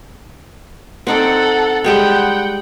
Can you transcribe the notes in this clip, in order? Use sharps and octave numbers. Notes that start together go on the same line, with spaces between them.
C4 D#4 A4 D5 F#5
G3 G#3 C#5 F#5 G5